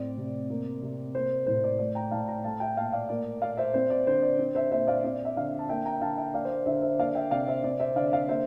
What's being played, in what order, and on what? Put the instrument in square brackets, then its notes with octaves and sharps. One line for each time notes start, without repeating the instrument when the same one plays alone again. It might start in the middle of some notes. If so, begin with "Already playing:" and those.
Already playing: [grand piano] A2 C4 D5
C3
A#3
C3
A#3 C5
A2 C5
D5
A3 D5
G5 A#5
A2 F5 A5
G5 A#5
A3 F5 A5
E5 G5
A#2 F5 A5
D5 F5
A#3 D5
A#2 D5 F5
C5 E5
C4 C5
D5
D3 C5
D5
C4
C5 E5
A#2 C5 E5
D5 F5
C4 D5
E5
D3 D5 F5
A5
A#3 E5 G5
G5 A#5
D3 F5 A5
E5 G5
A#3 D5 F5
C5
D5
D3 C5 E5
C5 E5
A#3 D5 F5
E5 G5
C3 D5 F5
C5 E5
C4 D5
C5 E5
D3 D5 F5
D5 F5
A#3 C5 E5